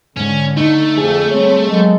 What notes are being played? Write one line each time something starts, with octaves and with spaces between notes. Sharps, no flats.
G#2 D3 C#4
A3 D#4
F2 G#4
G3 C4 C#5
F#3 G#3 A#3 A4